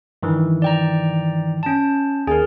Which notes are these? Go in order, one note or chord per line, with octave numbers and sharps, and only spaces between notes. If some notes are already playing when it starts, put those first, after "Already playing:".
G2 D#3 E3
D5 G5 A#5
C#4 A5
D#2 G#4 A#4 G#5